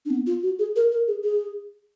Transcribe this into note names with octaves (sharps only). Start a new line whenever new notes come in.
D4
B3
F4
F#4
G#4
A#4
A#4
G#4
G#4